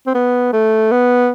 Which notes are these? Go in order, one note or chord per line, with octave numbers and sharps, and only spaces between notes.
C4
B3
A3
B3